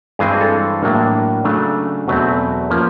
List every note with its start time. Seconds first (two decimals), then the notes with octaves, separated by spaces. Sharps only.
0.19 G2 E3 G#3 C4 G#4
0.41 A4
0.82 A2 F#3 A#3 D4
1.44 C#3 F#3 A3 D4
2.08 E2 B2 F#3 A3 C4 B4
2.70 F3 A#3 C#4